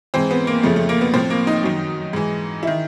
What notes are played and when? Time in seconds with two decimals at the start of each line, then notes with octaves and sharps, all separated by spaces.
0.14 G#2 E3 C4
0.31 B3
0.47 A#3
0.63 F2 C#3 F3 A3
0.76 A3
0.89 A#3
1.01 B3
1.14 A2 F3 C4
1.30 A#3
1.47 D#4
1.63 F#2 D#3
2.13 G#2 E3
2.63 E4
2.67 D#3